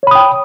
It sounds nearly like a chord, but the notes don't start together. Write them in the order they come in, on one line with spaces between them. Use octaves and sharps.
C#5 B5 D#6 G5